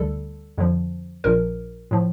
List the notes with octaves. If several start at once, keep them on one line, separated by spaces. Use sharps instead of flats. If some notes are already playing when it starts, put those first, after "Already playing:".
Already playing: D2 D3 G3 A4
F2 D3 F3
A#1 A#2 F3 A#4
A2 F3